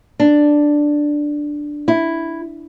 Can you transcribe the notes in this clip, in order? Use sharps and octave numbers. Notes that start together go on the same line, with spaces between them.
D4
E4